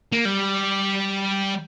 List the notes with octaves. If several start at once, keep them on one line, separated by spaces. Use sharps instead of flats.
A#3
G3